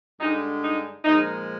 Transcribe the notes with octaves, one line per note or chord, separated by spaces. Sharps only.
G2 D3 G#3 D#4
D#4
A#2 F3 G#3 D#4